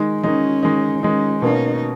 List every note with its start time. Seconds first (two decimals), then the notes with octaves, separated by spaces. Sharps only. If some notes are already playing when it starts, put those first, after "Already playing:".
Already playing: D#3 G#3 D#4
0.22 D#3 G#3 C#4 D#4
0.63 D#3 G#3 D#4
1.02 D#3 G#3 C#4 D#4
1.42 B2 A#3 C#4 D#4